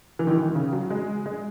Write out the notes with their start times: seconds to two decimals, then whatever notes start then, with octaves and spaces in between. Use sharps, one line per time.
0.19 E3
0.27 D#3
0.30 E3
0.43 D#3
0.55 C#3
0.73 F#3
0.90 G#3
1.26 G#3